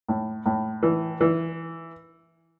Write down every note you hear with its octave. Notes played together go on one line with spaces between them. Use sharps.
A2
A2
E3
E3